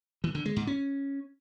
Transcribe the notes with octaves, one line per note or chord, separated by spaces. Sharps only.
E3
D3
G#3
G#2
C#4